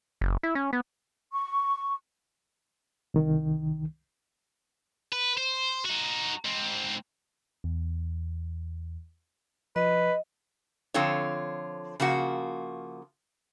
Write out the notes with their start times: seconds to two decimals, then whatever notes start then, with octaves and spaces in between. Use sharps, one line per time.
0.21 F#1
0.43 E4
0.55 C#4
0.73 B3
1.33 C#6
3.14 C2 D#3
5.13 B4
5.38 C5
5.85 D#4 F#4
6.45 G#2 C4
7.64 E2
9.76 F3 B4 D#5
10.94 D3 F3 C4 F4 A4 C#5
12.00 C#3 F3 A#3 F#4